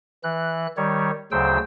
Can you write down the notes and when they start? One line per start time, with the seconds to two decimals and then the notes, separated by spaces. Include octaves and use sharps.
0.23 E3 F#6
0.77 D#3 G3 C#5
1.32 D2 C#3 F#3 C5 G5 E6